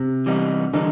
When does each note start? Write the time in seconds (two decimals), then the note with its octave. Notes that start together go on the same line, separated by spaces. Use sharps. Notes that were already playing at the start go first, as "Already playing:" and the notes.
Already playing: C3
0.26 E3 G3 B3 D#4
0.73 D3 E3 G3 B3 D#4